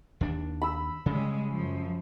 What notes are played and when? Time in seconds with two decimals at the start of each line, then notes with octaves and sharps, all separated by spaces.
0.21 D#2 D4
0.62 B5 E6
1.06 C#3 G3 G#3 C#4
1.52 F#2 F3